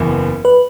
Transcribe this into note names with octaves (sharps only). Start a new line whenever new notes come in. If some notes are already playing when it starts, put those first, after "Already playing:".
Already playing: F#1 E2 E3 B3
B4